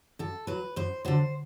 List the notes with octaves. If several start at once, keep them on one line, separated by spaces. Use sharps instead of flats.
F#2 A4
F#3 B4
F#2 C5
D3 F#3 C5